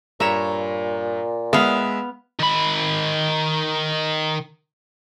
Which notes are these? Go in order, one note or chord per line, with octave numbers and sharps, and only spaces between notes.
G2 A#2 C#5 E5 A#5 E7
G#3 B3 E5 F5 D#6
D#3 B5